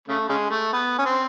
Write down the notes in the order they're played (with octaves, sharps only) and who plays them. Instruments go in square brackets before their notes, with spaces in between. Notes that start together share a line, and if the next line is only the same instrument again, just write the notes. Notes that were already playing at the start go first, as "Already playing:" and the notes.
[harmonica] C#3 A3
C#3 G#3
A3
B3
C#4
C4